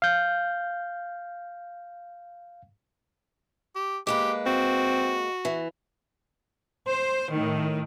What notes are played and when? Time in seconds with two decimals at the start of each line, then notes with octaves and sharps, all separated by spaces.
0.02 F5 G6
3.76 G4
4.07 G#3 A#3 G4 B4
4.46 C4 F#4
5.45 E3
6.88 C5
7.31 A2 D#3